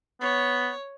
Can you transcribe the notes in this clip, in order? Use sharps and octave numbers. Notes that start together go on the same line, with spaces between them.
B3 C#5